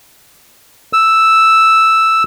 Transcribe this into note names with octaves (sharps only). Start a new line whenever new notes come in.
E6